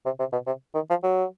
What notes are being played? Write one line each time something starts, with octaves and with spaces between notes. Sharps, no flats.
C3
C3
B2
C3
D#3
F3
F#3